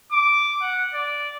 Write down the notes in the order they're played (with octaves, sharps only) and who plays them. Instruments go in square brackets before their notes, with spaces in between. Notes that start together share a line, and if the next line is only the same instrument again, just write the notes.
[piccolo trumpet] D6
F#5
D5